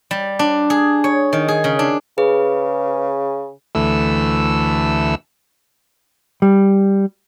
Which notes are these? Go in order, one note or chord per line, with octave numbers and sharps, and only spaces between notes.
G3
D4
G#4
C#5
D#3
G#4
C#3
D4
C#3 G#4 B4
D2 E3 A3 E6
G3